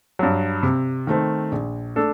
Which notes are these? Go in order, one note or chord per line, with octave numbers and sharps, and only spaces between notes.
G2 F#3
C3
D#3 A3 C4
A#1
A3 D4 A4